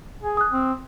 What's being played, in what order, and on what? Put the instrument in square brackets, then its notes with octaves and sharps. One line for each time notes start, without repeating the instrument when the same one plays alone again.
[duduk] G#4
[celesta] D#6 F#6
[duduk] C4